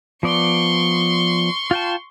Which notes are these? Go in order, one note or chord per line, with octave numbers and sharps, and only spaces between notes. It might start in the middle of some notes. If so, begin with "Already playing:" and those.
F3 B3 D5 C6 C#6
F4 G5 A5